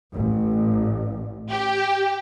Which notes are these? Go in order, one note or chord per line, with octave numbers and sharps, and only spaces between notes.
A1
G4